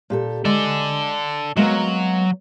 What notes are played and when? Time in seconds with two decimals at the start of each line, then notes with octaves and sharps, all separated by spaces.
0.10 A#2 G4 A4
0.45 G#3 A4 D5 G#5
1.57 F#3 G#3 A#3 B3